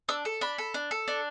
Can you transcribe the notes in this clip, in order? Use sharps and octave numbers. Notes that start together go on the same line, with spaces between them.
D4 E6
A4
D4 B5
A4
D4
A4
D4